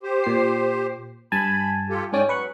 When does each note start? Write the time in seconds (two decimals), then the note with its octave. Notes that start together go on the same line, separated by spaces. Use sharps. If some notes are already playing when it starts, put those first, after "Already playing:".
0.03 G4 C5
0.24 A#2 C7
1.32 G2 G#5 A5 B5
1.90 F4 G4 A4
2.12 G#2 G#3 C#4 D5 G5 G#5
2.29 F#3 B4 C#6 F#6